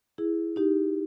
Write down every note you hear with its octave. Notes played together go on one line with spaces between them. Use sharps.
E4 G#4
D#4 G4